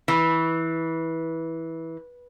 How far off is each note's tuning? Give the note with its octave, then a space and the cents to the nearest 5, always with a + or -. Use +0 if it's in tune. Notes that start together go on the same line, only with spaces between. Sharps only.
E3 -15